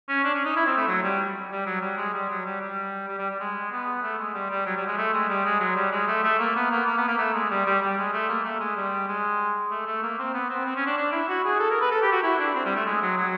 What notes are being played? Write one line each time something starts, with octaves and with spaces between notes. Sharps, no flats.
C#4
D4
C#4
D#4
E4
C4
A3
F#3
G3
G3
F#3
G3
G#3
G3
F#3
G3
G3
G3
G3
G3
G#3
B3
A3
G#3
G3
G3
F#3
G3
G#3
A3
G#3
G3
G#3
F#3
G3
G#3
A3
A3
A#3
B3
A#3
A#3
B3
A#3
A3
G#3
G3
G3
G3
G#3
A3
A#3
A3
G#3
G3
G#3
A3
A3
A#3
C4
B3
C4
C4
C#4
D4
D4
E4
F#4
G#4
A4
A#4
B4
A4
G4
F#4
E4
D4
C4
G3
A3
G#3
F#3
F#3